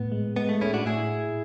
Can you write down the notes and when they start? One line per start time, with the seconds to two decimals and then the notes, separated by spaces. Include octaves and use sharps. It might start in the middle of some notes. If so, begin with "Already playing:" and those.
Already playing: A2 B3
0.12 G#3
0.36 G#3 B3
0.49 A3
0.61 A2 C#4 E4
0.74 D4 F#4
0.86 A2 E4 G#4